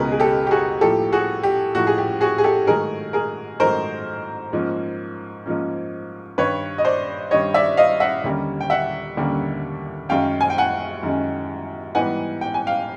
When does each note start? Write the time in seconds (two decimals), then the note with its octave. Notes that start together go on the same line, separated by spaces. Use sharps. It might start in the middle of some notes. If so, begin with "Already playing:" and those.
Already playing: C#2 B2 G#3 C#4 G#4 A#4 B4
0.12 G#4
0.20 G4 A4
0.47 G4
0.51 F#4 G#4
0.81 A2 F3 A#3 G4 A4
1.12 F#4 G#4
1.43 G4
1.75 A2 F3 A#3 F#4
1.87 G#4
1.98 G4
2.21 F#4 G#4
2.38 G#4
2.44 G4 A4
2.67 G#2 D#3 F#3 A3 G#4 A#4
3.13 G#4 A#4
3.60 G#2 D#3 F#3 A3 A#4 C5
4.53 G#2 F3 A#3 C#4
5.46 G#2 F3 A#3 C#4
6.38 G2 D#3 G3 B4 C#5
6.78 D#5
6.85 C5 D5
7.31 G2 D#3 G3 C#5 D#5
7.54 D5 E5
7.77 D#5 F5
8.00 E5 F#5
8.24 D#2 D3 G3 A#3 C#4
8.61 G5
8.70 E5 F#5
9.17 D#2 D3 G3 A#3 C#4
10.09 F#2 D#3 G#3 C#4 F5 G5
10.41 G#5
10.50 G5
10.58 F#5 G#5
11.03 F#2 D#3 G#3 C#4
11.95 G#2 E3 G3 B3 F#5 G#5
12.41 G5
12.54 G#5
12.67 F5 G5